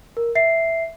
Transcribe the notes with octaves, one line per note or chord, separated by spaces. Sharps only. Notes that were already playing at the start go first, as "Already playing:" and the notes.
A#4
E5 C7